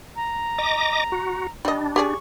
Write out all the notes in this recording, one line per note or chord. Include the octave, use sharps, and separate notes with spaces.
A#5
D#5 D6 A#6
F#4
G3 D4 D#5
G4 G#4 D5 C#6